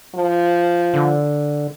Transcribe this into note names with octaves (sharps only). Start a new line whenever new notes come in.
F3
D3